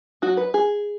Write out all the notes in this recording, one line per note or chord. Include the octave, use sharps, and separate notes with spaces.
F#3 D#4 F#4
B4
G#4